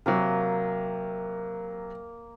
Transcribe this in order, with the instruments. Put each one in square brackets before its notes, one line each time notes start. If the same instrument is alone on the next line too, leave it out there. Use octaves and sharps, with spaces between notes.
[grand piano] C3 F#3 [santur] A#3 A#4